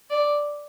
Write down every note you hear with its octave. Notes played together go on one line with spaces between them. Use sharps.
D5